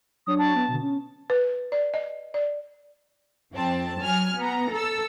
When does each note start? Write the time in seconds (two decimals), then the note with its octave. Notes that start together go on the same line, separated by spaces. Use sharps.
0.27 F#3 D4 C#5 D#6
0.39 A5
0.55 B3
0.68 B2 D3
0.81 C#4
1.30 B4
1.72 D5
1.94 D#5
2.34 D5
3.54 F2 C4 A5
4.00 F#3 G#5 F6
4.38 B3 A#5
4.72 A4 E6